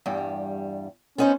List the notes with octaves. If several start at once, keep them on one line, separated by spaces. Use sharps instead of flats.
E2 G2 G3
B3 C#4 D#4 C5